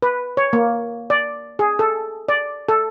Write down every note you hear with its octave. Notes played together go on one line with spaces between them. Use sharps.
B4
C#5
A#3
D5
G#4
A4
D5
A4